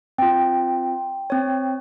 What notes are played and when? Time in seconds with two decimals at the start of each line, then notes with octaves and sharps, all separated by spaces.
0.18 C4 F4 G5
1.30 C4 C#5